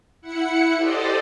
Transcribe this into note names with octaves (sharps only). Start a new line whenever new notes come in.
E4 F#5 C#7
G4 A4 C5 D5 D#5